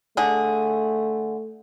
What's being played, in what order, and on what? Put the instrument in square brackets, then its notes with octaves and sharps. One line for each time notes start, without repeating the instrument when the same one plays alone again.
[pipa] D3 G#4 [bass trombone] A3